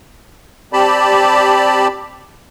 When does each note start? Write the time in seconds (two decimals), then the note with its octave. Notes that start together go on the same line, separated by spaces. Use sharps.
0.73 C4 G4 D5 A5 B5